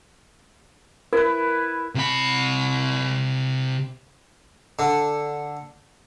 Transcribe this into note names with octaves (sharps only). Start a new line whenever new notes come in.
E4 A#4 B4
C3 B5
D3